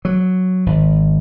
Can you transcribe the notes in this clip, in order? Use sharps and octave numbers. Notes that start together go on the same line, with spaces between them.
F#3
G#1